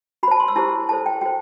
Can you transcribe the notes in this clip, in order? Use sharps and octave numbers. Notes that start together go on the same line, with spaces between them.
F#4 C5 A5 B5
C6
E6
E4 G4 C5 A5
E4 A4 C5 A5
G5
F#4 C5 G5